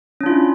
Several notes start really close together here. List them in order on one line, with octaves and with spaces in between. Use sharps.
C#4 D4 F4 E4